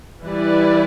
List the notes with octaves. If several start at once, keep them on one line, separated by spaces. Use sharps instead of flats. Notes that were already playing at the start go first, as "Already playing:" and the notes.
E3 G3 E4 B4 D5